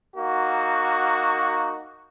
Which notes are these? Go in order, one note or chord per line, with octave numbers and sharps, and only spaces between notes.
A#3 D#4 F#4